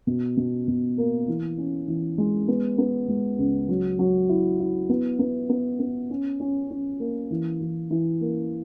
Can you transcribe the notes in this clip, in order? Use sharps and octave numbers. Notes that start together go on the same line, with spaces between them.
B2
B2
B2
A#3
E3
C#4
E3
G#3
B3
B3
G#3
C#2
F#3
F#3
E4
E4
B3
B3
B3
B3
C#4
C#4
C#4
A#3
E3
E3
E3
A#3